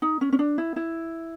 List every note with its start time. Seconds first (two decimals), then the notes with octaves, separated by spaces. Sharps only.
0.02 D#4
0.21 C#4
0.33 C#4
0.39 D4
0.58 E4
0.76 E4